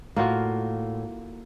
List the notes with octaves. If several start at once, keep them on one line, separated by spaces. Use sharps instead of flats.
A2 A#3 F4 F#4